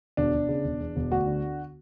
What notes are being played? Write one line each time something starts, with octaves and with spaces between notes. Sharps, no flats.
E1 D4
E1
C#3
E1
E2
E1
D2 F#4
D3